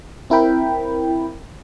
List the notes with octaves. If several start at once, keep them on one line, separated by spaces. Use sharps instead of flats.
C4 E4 A#4 G5 B5